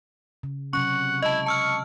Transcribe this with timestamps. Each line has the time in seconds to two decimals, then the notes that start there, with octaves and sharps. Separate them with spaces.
0.43 C#3
0.73 C3 F#3 C#4 F#5 C#6
1.22 G#3 E4 D#5 A5
1.46 A5 C#6 E6 F6